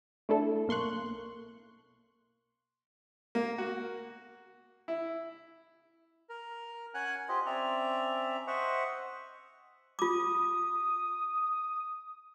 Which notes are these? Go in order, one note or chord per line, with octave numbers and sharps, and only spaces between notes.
A3 D4 E4 A4
B1 A#3 C6 C#6 F#6
A#3
F#4
E4
A#4
C#4 F#5 G#5 F#6
F4 G4 C5 D#5
C4 C#4 D5 E5 A#5
C5 D#5 E5 F#5 C#6
F4 D6 D#6